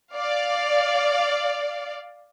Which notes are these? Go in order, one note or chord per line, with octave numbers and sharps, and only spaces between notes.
D5 F5